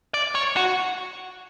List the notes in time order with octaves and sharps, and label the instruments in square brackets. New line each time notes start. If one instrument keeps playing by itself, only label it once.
[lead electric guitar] D5
C#5
F#4